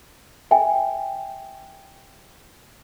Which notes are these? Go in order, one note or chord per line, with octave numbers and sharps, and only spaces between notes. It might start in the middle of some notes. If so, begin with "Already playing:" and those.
E5 G5 G#5